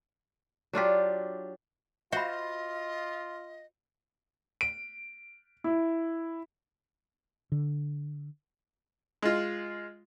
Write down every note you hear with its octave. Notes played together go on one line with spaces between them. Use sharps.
F#3 D4 F4 G4
F4 F#4 C5 D#5 E5 B5
D7
E4
D3
G#3 F4